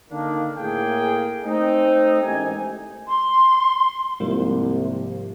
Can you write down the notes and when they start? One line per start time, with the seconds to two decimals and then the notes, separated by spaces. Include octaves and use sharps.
0.10 D3 D#3 A#3 D4
0.57 A2 A#3 G#4 G5
1.44 A3 C4 D#4
2.23 A1 G#2 C3 D#3 D#5 G#5
3.08 C6
4.20 C2 G#2 F3 A#3